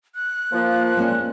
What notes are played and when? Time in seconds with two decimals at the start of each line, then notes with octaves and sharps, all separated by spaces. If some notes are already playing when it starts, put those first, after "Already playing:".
0.15 F#6
0.53 F3 A#3
0.97 A#2 G#3 A#3 C#4